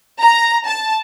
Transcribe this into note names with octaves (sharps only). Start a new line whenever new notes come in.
A#5
A5